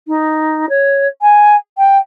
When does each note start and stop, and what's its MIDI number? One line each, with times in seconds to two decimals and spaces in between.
0.08 0.66 63
0.69 1.08 73
1.22 1.56 80
1.78 1.98 79